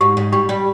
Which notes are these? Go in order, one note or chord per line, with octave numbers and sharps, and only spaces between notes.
G#2 G4
G#2
G3 G4
G3